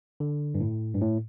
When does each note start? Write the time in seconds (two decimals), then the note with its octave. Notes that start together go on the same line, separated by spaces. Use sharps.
0.20 D3
0.55 G2
0.60 A2
0.94 G2
1.01 A2